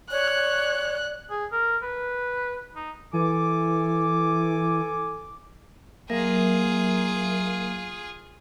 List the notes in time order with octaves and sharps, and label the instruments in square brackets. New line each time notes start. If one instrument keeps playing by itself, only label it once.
[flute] C#5 [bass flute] D5 [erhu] F#6
[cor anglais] G#4
A#4
B4
D#4
[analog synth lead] E3 [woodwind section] A4 G#5 D6
[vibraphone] F#3 A#4 E5 [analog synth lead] A#3 [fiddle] F4 G#4